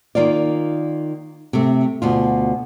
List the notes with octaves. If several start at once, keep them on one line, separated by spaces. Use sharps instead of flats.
D#3 A#3 F4 D5
C3 A3
D2 B2 F4